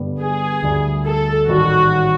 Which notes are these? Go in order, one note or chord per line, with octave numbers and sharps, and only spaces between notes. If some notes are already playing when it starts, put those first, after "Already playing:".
Already playing: G2 D3 G3 B3
G#4
D2 D3 G3
A4
A1 G#2 D#3 G3 F#4